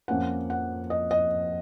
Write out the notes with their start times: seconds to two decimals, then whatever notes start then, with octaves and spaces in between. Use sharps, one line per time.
0.08 F2 F3 A#3 C#4 F#5
0.50 F#5
0.90 D#5
1.11 D#5